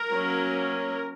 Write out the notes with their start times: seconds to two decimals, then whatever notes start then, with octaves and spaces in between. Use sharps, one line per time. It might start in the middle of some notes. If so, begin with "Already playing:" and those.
Already playing: A#4
0.09 F#3 A#3 C#4